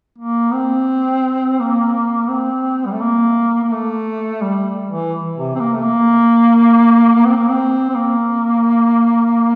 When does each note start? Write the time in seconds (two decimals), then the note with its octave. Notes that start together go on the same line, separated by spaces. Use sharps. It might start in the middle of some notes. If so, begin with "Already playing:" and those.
0.18 A#3
0.53 C4
1.60 A#3
2.30 C4
2.86 G3
2.92 A3
3.00 A#3
3.63 A#3
3.72 A3
4.42 G3
4.89 E3
5.36 C3
5.55 C4
5.60 A#3
5.74 A3
5.83 A#3
7.25 C4
7.36 A#3
7.50 C4
7.90 C4
7.95 A#3